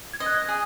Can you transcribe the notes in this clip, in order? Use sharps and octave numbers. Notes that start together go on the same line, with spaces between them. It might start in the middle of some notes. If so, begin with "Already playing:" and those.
G#6
D#5
F#6
G#6
G#4